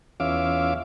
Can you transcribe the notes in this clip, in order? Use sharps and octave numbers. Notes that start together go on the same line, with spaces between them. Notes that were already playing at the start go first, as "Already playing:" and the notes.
E2 C#4 F4 E5 F5 D6